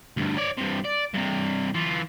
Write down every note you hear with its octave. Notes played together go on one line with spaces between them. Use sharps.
D2 G2
C#5 D5
G2 C3
D5
G2 C3
E3 F4